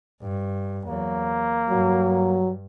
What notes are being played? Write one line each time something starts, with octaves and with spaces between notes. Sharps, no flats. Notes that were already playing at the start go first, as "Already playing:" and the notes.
G2
E2 F#3 A#3
G2 F#3